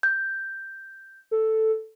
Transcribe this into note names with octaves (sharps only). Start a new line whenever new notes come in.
G6
A4